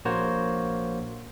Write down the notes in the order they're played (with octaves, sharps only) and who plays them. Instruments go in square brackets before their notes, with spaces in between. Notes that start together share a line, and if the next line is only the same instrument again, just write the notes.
[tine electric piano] A#1 A#3 F#4 C5 C#5